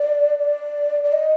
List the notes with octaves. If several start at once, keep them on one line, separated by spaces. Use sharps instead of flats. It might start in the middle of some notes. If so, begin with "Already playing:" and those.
Already playing: D5
D5
D5
D#5